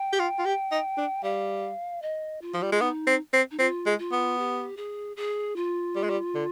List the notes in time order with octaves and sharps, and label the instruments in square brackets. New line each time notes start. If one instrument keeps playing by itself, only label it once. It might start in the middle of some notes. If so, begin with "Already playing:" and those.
Already playing: [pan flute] G5
[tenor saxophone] G4
F4
F4
G4
D#4
D4
[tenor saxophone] G3 [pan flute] F5
[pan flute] D#5
F4
[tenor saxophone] F3
G3
G#3
[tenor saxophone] B3 [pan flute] D#4
[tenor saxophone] C4
C4
[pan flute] D#4
[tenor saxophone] C4 [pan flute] F4
[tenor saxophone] G#3
[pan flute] F4
[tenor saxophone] B3
[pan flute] G4
G#4
G#4
F4
[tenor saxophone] G3
G#3
G3
D3